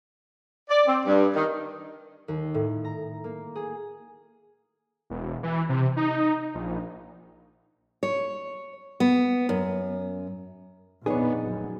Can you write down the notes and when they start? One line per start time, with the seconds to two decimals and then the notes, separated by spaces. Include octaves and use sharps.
0.70 D5
0.87 C4
1.06 G2
1.35 D#3
2.28 D#2
2.54 A2
2.85 A#5
3.24 A#3
3.55 G#4
5.10 E1
5.43 E3
5.69 C3
5.97 D#4
6.54 A#1
8.03 C#5
9.00 B3
9.49 F#2
11.06 A#1 F2 B3 D#4 G#4 B4 C#5 D5
11.45 D1 F#2